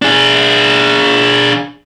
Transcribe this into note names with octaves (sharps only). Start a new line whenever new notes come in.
D4 G#4